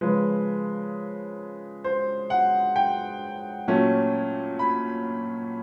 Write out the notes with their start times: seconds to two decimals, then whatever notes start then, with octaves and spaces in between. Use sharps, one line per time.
0.01 C#3 F3 G#3 B4
1.84 C5
2.30 F#5
2.76 G5
3.68 A#2 F#3 A3 C#4
4.59 B5